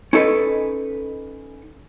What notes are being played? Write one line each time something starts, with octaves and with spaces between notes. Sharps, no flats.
C#4 D#4 A4 B4 D#5